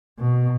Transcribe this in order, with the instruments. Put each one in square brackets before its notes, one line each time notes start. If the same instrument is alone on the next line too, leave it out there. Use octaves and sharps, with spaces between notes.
[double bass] B2